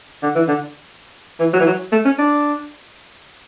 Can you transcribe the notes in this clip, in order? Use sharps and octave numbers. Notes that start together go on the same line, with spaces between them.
D3
E3
D3
E3
F#3
E3
F#3
A3
C#4
D4